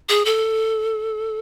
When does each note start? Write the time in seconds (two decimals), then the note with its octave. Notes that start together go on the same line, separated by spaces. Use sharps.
0.09 G#4
0.25 A4